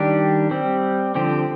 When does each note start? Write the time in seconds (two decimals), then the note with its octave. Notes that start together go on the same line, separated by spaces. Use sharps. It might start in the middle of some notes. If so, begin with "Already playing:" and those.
Already playing: D#3 G3 D4 G4
0.51 G3 C4
1.15 D3 F3 C4 G4